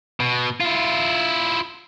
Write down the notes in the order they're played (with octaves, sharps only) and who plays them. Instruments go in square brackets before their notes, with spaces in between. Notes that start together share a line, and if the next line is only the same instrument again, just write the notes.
[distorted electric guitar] B2
E4 F4